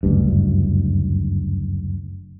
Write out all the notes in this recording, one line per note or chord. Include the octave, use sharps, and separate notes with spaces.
F#1 D2 G2